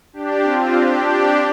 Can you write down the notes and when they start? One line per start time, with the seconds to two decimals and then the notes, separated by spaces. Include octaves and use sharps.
0.13 D4 G4
0.43 C4 F4
0.73 D4 G4
1.04 D4 G4